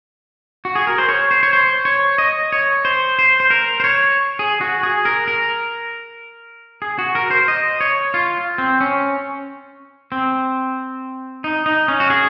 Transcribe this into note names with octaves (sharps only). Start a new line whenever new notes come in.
F#4
G#4
A#4
C5
C#5
C5
C#5
C5
C#5
D#5
C#5
C5
C5
C5
A#4
C5
C#5
G#4
F#4
G#4
A#4
A#4
G#4
F#4
A#4
C5
D#5
C#5
F4
C4
C#4
C4
D#4
D#4
C#4
F#4
G#4